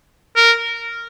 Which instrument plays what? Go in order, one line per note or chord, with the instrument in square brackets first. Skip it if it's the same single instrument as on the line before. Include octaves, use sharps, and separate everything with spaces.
[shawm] A#4